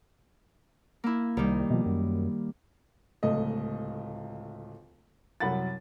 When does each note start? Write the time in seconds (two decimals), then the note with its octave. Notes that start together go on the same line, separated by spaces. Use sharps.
1.04 A#3 E4
1.37 C2 D#3 G3
1.70 B2 F3
1.86 F#2
3.23 D1 C#2 A3 D#5
5.40 C2 F#2 F#5 B5 A6